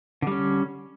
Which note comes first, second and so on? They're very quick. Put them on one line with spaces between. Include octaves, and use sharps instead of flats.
D3 G3 C#4